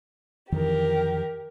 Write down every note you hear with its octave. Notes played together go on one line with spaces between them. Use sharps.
F2 D#3 E3 G4 A#4